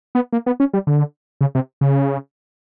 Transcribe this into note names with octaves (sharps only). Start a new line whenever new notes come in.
B3
A#3
B3
C#4
G3
D3
C#3
C3
C#3